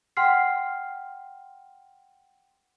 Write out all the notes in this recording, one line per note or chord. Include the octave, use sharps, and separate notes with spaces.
F#5 G5 C6 F6 C7